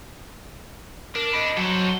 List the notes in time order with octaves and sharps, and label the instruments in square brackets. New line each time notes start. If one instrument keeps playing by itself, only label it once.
[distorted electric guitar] D4 [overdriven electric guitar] A#4
[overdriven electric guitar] D#5 B5
[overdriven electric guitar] F#3 [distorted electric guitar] A4 C5